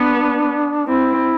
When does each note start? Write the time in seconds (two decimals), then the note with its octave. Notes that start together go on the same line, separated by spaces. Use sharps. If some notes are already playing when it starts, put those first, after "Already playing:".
Already playing: B3 D4
0.87 C4 E4